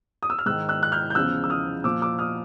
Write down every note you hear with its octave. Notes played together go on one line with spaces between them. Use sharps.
D#6
E6
F6
G#2 D#3 E6 F#6
E6 F#6
F#6
F6 G6
G6
E2 C#3 F3 E6 F#6
E6
D#6 F6
A#2 F3 D6 E6
D6 E6
D#6 F6